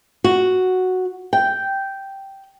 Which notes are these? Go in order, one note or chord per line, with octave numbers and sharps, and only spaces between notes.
F#4
G5